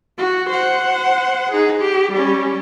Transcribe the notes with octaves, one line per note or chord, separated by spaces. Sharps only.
F#4
C5 F#5
D#4 G#4
G4
G3 C#4